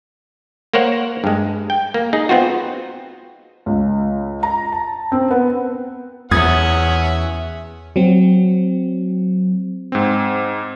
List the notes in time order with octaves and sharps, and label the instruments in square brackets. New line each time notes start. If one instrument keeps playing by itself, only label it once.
[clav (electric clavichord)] A#3 A#4 C5 C#5 F#5
G2 G#3
G5
A#3
D#4 G#4
B3 C4 F4 F#4
[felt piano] C#2
A#5
A5
C4
B3
[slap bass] E2 [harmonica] C#4 F#5 [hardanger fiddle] E5 [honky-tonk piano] D#6 G#6
[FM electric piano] F#3 C4
[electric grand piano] G#2 C4